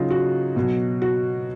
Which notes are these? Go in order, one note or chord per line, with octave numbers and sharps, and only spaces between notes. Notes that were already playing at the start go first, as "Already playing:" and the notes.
Already playing: C#3 F#3 D#4 F4
F#4
B2 F#3
F#4